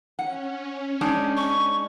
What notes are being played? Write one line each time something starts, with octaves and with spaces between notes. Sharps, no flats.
C#4 F#5
G#3 D4 D#4
C#6